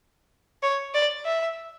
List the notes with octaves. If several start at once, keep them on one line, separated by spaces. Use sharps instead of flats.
C#5
D5
E5